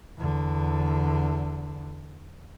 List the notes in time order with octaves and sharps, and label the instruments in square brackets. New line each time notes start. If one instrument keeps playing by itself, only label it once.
[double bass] E2 D3